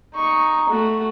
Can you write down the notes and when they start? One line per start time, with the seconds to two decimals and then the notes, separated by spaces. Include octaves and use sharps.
0.15 D#4 C#6
0.69 A3 F#4